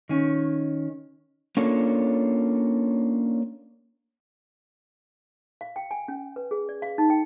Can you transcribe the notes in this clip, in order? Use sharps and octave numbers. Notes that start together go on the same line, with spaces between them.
D#3 C#4
A#3 C#4 D4 F4 A4 C#5
F5
G5
G#5
C#4
B4
G#4
D5
F5
D#4
G5